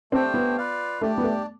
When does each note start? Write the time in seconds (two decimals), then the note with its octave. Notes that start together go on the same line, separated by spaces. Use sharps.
0.12 A3 C4 D4 G4 C5 G5
0.34 B3
0.57 F4 B4 D5 F5
1.01 A3 D4 G4 D5
1.18 B3
1.23 A3